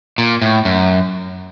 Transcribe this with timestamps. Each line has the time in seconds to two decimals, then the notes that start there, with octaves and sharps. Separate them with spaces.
0.18 A#2
0.42 A2
0.65 F#2